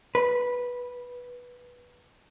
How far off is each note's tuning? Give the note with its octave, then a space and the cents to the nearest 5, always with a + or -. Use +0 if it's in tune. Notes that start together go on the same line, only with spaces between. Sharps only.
B4 -10